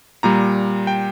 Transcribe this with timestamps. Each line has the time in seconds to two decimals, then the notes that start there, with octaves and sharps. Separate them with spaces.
0.23 A#2 G3 A#5
0.87 G5